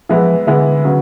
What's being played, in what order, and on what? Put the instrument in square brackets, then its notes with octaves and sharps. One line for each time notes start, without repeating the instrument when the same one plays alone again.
[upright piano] E3 G#3 B3 E4 [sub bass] F3
[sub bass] D3 [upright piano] E3 G#3 B3 E4
[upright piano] C#3 F#3 B3